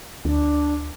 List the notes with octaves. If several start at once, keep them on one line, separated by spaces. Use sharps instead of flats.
D2 D4